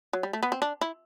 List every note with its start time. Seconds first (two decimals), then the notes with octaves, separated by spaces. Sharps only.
0.13 F#3
0.23 G3
0.33 A3
0.43 B3
0.52 C4
0.62 D4
0.81 E4